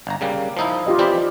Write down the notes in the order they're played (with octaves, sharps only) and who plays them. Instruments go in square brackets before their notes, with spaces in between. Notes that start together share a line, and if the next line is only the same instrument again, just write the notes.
[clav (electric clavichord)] G1 A#5
C#3 G3 A#3
F3 D#4 E4
[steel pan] F4 G4 D#5
[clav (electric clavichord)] E3 C4 G4 [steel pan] D5 B5